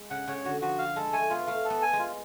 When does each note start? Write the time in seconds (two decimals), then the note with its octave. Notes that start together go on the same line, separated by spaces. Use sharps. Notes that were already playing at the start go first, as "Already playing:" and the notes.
Already playing: G#3
0.10 C#3 F#5
0.28 C#3 C#5
0.45 D3 F#4
0.61 F3 F#4
0.78 F5
0.96 G#3 A4
1.13 A3 G#5
1.30 B3 F4
1.47 A3 F5
1.65 A4
1.70 B3
1.82 G#5
1.93 G#3
1.99 F4